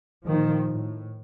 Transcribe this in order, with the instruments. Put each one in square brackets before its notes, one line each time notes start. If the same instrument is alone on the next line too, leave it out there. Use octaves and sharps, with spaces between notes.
[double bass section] A#2 D#3 F3
A2